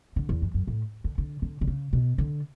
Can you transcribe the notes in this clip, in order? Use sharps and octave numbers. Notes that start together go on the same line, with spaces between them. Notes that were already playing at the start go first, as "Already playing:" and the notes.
D3
E2
F#2
F#2
A2
D3
D3
D3
D3
C#3
B2
D3